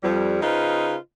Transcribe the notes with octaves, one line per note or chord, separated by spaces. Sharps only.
F2 F3 G3
C#3 D#4 F4 B4 C5 D#5